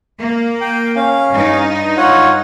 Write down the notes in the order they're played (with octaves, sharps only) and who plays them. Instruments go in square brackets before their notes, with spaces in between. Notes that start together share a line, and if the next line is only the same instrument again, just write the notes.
[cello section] A#3
[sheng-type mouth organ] G5
C#4 F5
[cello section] G2 D#4
[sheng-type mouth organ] F4 C#5 F#5